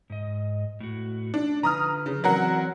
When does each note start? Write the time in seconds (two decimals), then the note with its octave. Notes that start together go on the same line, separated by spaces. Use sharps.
0.10 G#2 D#5
0.80 A2 F#4
1.34 D4
1.63 D3 F3 B4 A#5 D#6 F6
2.06 C#3
2.24 E3 F#3 C4 A#4 D5 F#5